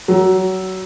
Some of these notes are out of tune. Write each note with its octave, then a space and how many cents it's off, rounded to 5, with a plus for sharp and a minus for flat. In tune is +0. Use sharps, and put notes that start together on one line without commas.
F#3 +25